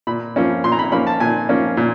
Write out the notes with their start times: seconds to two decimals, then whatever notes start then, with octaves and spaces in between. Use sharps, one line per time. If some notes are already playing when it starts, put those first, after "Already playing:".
0.07 A#2 B5
0.36 F3 A#3 C#4
0.64 A#2 C6
0.72 A#5
0.79 B5
0.92 F3 A#3 C#4 B5
1.07 A5
1.20 A#2 G#5
1.49 F3 A#3 C#4
1.77 A#2